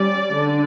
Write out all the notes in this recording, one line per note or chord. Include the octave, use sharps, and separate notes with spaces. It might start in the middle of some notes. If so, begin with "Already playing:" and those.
Already playing: G3 C#4 D5
D3